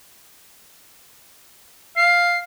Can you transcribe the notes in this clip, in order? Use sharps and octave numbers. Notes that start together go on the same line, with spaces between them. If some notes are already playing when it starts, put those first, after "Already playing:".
F5 C7